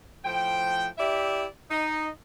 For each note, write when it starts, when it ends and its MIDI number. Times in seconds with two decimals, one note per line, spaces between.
0.25 0.88 45
0.25 0.88 53
0.25 0.88 72
0.25 0.88 79
0.98 1.46 64
0.98 1.46 67
0.98 1.46 74
0.98 1.46 76
1.70 2.09 63
1.70 2.09 75